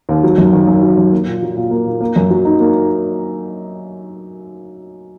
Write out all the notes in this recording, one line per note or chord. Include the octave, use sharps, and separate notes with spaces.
D#2
F#3
F#2
D#3
F#2
F#3
F#2
A#3
A#2
F#3
A#2
A#3
A#2
A#3
F#2
F#3
D#4
A#3